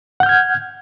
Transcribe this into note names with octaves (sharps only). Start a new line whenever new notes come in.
F#5 F6 G6 G#6